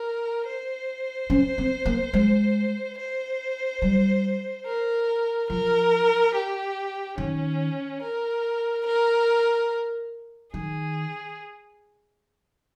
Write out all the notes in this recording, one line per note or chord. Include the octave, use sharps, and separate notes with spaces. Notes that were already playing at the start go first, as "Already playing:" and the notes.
Already playing: A#4
C5
C#4
C4
A#3
G#3
C5
G3
A#4
F3 A#4
G4
D#3 C#4
A#4
A#4
D#3 G#4